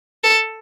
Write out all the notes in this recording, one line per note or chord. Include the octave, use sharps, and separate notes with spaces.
A4